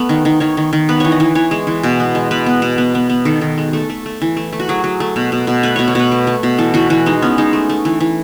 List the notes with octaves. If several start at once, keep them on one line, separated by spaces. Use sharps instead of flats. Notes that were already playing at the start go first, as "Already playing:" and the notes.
Already playing: A3 B3
D#3
D#3
D#3 C#5
D#3
D#3
B3 B4
E3 C#5
D#5
E3
E3 C#5
G#3
E3
B2
B3
G#3
B2 B4
B3
B2
B3
B3
B3
D#3 A4
D#3
G#3
A3 A4
A3
A3
E3
A3
A3
F#4
F#3 G#4
F#3
A3
B2
B2
B2
A3 B4
B2 C#5
C#5
B2 B4
A3
A3
B2
E3 A4
E3 F#4
E3 F#4
G#3 D#4
B3 C#4
G#3 D#4
A3
A3
E3
E3